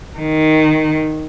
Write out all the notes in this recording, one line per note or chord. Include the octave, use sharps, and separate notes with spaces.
D#3